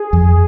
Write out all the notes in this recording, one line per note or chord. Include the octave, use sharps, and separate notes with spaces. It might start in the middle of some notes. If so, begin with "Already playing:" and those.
Already playing: G#4
F2